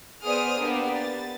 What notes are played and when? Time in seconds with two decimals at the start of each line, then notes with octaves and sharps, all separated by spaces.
0.23 B3 G#4 C5 D5 D#6 F6
0.57 A#3 B3 D4 G4
0.94 A6